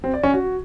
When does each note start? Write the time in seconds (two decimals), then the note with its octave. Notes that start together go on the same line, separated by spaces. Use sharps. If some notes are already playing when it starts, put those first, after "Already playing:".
0.04 C4
0.14 D5
0.23 C#4
0.33 F#4